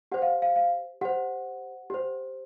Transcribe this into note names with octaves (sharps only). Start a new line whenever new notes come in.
G4 C5 F#5
F5
F5
F5
G4 C5 F#5
G4 C5